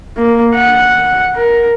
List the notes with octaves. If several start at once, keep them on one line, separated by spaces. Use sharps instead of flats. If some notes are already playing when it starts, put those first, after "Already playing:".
A#3
F#5
A#4